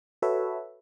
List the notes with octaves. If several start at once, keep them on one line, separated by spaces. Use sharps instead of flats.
F#4 A4 B4 C#5 E5